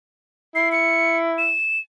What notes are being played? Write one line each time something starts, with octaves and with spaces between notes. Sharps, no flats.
E4 C7
C#7
E7